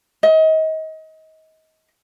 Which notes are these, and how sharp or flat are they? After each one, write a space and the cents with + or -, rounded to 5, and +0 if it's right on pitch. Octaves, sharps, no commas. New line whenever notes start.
D#5 +30